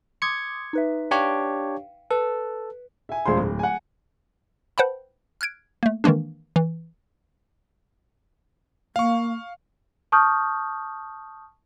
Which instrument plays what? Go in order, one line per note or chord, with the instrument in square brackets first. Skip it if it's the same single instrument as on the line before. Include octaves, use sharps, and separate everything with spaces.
[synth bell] C6 D6 D#6 [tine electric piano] G#6 C#7
[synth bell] D#4 B4 E5
[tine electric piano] D4 G4 C#5 [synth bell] F5 G5
[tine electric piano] A4 [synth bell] B4
[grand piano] E5 G#5
E1 F4 C5 C6
D1
F#5 G#5
[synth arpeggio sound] B4 C5 F#5 G5 A5 B5
F6 F#6 G#6 D7
A3 A#3
D#3 E3 G#3 A#3 D4
E3
[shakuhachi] A#3 [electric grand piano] F5 C#6
[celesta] A5 C#6 D#6 F6 G6